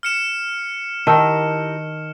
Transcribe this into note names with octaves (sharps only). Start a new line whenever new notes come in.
F6 C#7 E7
D#3 E4 G4 A#4 A5 E6